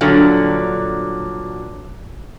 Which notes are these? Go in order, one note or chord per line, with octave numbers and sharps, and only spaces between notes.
G2 A#2 D3 F#3